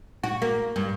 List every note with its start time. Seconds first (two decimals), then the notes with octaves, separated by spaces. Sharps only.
0.23 F#4
0.42 A#3
0.76 G2